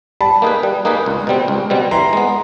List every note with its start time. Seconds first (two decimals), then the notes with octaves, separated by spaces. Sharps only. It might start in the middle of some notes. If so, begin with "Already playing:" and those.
0.21 G3 A5 B5
0.42 A#3 D#4 G#4 B4
0.63 G3
0.85 A#3 D#4 G#4 B4
1.06 C#2
1.27 B2 G3 C4
1.48 C#2
1.70 B2 G3 C4
1.91 E3 A#5 C6
2.13 G#3 B3